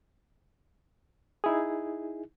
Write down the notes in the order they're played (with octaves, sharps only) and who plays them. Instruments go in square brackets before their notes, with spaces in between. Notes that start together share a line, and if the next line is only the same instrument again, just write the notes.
[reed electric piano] D#4 E4 G#4